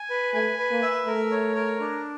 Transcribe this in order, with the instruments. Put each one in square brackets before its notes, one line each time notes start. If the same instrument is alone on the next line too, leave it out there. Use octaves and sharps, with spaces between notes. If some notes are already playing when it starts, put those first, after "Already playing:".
Already playing: [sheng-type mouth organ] G#5
B4
[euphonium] A3 [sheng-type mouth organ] G#5
[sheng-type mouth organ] B4
[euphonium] A#3
[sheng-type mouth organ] E5
[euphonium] A3 [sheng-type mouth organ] A#4
[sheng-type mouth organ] C#5
A#4
D4